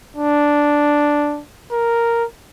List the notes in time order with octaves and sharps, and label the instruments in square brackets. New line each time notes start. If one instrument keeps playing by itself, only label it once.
[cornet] D4
A#4